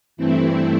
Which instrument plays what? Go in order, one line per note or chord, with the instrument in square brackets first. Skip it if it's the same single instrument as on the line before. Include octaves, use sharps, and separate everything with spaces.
[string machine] G2 E3 A3 C4 E4